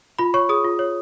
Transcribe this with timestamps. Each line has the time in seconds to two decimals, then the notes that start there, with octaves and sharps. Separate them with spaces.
0.19 F4 B5
0.34 C#5 C#6
0.49 G#4 D#6
0.64 F4
0.79 C#5